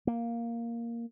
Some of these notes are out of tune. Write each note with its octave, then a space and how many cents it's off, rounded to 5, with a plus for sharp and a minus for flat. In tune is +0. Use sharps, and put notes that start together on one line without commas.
A#3 +0